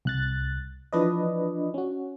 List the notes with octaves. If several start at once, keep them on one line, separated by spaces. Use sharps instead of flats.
C2 F#6 A6
E3 F3 D4 B4 D5 D#5
C#4 F#4